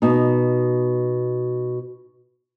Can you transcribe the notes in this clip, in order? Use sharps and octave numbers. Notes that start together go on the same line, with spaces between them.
B2 D#4